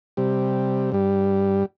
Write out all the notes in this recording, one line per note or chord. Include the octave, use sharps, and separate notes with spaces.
C3 G3
G2 G3